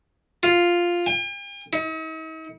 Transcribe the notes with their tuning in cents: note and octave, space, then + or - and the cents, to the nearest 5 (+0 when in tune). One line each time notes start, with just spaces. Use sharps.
F4 +0
G5 +45
D#4 +45